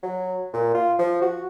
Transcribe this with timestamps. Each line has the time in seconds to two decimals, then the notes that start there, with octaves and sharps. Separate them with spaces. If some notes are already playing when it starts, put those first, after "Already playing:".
0.03 F#3
0.53 A#2
0.74 F4
0.99 F3
1.22 F#4